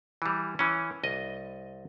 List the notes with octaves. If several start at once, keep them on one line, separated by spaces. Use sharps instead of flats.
E3 G3
E3 C#4
C2 D#5